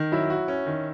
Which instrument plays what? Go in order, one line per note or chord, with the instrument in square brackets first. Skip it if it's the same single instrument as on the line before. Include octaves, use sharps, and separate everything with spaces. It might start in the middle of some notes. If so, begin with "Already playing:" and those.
Already playing: [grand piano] D#3
[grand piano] F#3 [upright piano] E4
[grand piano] F#4
C#4
D#3